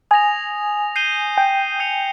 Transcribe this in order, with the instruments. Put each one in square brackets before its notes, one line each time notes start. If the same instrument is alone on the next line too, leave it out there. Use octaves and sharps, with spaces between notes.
[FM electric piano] G#5 [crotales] D#6 A#6 F7
[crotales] G6 C7 D#7 G7
[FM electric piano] G5
[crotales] D#6 G6 C#7 F7